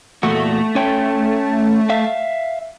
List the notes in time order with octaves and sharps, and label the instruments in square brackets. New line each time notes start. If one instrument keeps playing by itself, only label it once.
[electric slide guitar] E2 A#2 F#4 [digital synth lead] A3
[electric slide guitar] C#4 C#5 G5
E5 F5